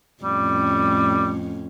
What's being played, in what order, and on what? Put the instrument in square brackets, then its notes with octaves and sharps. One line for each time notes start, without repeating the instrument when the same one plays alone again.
[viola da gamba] F2 A2 C#4 [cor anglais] G3